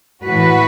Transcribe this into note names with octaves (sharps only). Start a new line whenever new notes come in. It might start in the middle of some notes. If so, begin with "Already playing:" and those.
A2 E3 F#4 B4